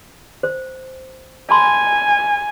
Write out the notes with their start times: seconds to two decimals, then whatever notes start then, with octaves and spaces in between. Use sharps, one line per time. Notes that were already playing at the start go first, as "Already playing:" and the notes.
0.43 C5
1.50 G#5 A5 B5 C6